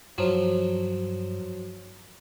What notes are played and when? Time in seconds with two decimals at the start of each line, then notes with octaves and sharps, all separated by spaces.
0.18 G2 F3 F#3